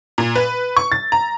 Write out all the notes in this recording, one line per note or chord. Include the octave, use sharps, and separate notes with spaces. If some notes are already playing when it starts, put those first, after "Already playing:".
A#2
B4
C#6
A6
A#5